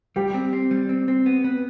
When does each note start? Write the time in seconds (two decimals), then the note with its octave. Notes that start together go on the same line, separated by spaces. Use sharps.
0.16 G3 G4
0.34 C4
0.53 C4
0.71 G3
0.89 C4
1.08 C4
1.26 B3
1.44 B3